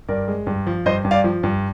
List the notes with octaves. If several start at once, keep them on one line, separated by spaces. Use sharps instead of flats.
G2 A#4 D5
G#3
G2
F3
G2 C5 D#5
G2
D5 F5
F3
G2